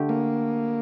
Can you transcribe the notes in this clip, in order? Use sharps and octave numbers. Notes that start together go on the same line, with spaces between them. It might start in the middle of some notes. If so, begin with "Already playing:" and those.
Already playing: D3 A3 G4
A#3